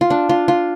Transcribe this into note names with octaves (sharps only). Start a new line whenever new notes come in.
F4
D4
F4
F4